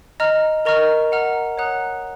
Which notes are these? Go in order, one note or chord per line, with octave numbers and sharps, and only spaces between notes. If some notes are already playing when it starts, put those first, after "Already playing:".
D#5 A#5 F6
A#4 D#5 A#5 C#6 F6
F#5 A#5 F6
C#5 F#5 A#5 D#6 F#6